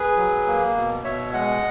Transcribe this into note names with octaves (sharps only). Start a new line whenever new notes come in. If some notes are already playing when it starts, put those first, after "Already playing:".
Already playing: G#4 B4
F#3
A#3
B2
B2 C#5 E5
G#3 D#5 F#5